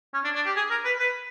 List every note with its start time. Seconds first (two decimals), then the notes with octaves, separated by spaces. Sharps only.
0.14 C#4
0.24 D4
0.35 D4
0.46 G4
0.56 G#4
0.70 A#4
0.85 B4
0.99 B4